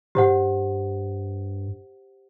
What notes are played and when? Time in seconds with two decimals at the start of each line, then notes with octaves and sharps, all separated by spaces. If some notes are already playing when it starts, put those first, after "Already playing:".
0.15 G2 G4 C5 F#5